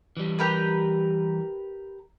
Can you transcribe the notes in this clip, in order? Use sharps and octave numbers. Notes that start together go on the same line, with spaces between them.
E3 G3
G4 A#4 B4